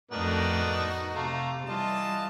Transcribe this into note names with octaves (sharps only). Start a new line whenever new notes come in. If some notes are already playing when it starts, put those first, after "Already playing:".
F2 A2 B3 D4 D#4 F#4 A#4
C3 A3 F5 A#5
E3 G3 F4 D#5 A5